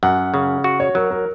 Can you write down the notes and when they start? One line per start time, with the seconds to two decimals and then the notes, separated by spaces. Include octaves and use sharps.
0.03 F#2 F#5
0.34 C#3
0.64 F#4
0.80 C#5
0.95 F#3 A#4
1.11 A#4